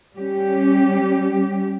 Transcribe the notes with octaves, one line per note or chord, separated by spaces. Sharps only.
G3 C#4 G4